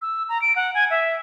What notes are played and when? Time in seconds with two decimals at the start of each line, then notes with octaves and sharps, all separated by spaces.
0.02 E6
0.29 A#5
0.42 D7
0.56 F#5
0.74 G#5
0.90 E5